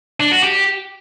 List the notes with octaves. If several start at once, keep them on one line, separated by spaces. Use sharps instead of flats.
D4
F#4
G4